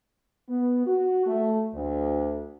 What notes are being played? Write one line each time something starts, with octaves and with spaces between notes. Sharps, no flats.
B3
F#4
A3
D2